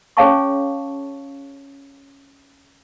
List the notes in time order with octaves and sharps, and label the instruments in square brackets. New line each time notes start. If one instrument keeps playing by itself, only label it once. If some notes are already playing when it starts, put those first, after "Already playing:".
[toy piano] C#4 G#4 C#5 F5 A5 C#6